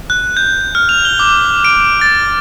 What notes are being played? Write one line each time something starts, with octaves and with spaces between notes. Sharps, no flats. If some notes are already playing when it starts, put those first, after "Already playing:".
F#6
G6
F6
F7
G7
D6
D7
A6